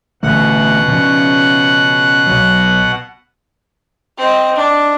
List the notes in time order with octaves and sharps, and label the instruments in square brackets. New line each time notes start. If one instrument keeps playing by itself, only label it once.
[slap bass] A1 D3 A3 [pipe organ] B2 F#5 F#6
[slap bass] C#3 F3 C#4
B1 F#3
[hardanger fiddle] C4 D#5
D4